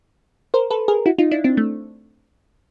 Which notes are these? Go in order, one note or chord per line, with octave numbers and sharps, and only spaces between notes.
A#4 C5
A4 B4
G#4 A#4
E4 F#4
D#4 F4
D4 E4
C4 D4
A3